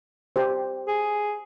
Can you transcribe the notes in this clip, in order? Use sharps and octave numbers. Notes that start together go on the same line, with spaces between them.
G4 C5
G#4